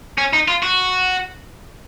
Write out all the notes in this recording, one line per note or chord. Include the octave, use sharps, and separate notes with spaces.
C#4
D#4
F4
F#4